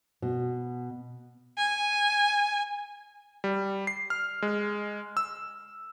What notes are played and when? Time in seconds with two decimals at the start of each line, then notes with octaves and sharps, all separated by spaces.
0.22 B2
1.58 G#5
3.44 G3
3.87 C7
4.10 F6
4.42 G#3
5.17 E6